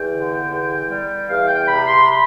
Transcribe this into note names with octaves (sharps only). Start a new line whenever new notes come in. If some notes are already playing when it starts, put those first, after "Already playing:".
Already playing: E2 G5
D3
E2
G3
E2 F5
G5
C3 B5
C6
B5